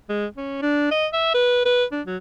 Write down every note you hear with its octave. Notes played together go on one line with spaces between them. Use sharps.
G#3
C#4
D4
D#5
E5
B4
B4
D4
F#3